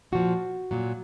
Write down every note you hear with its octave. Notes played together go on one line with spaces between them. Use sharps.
A#2 F3 F#4
A#2 F#3